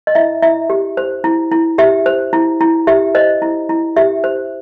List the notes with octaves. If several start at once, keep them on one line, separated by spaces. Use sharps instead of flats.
D#5
E4 E5
E4 E5
G4
C5
E4
E4
G4 E5
C5
E4
E4
G4 E5
C5 D#5
E4
E4
G4 E5
C5